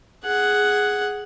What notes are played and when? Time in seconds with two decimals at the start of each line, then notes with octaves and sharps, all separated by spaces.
0.25 G#4 F#5